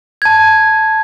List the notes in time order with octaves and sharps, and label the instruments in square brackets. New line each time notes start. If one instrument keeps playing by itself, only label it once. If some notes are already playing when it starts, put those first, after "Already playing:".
[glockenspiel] A5 G#6